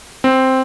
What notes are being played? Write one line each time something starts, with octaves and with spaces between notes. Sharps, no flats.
C4